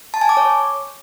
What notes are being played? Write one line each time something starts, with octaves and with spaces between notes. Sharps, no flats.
A5
G#5
D6
C#5